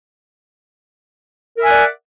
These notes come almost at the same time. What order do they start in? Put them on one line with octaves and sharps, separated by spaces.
A#4 E5 G#5 F#5 D5